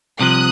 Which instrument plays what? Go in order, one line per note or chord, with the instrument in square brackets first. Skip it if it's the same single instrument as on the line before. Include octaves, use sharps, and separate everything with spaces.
[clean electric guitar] C2 C3 F3 [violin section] D#6 F#6